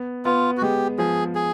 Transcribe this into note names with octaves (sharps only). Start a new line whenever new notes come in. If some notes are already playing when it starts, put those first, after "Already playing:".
Already playing: B3
B3 F4
F#4
G#3 G4
F3 G#4
G#4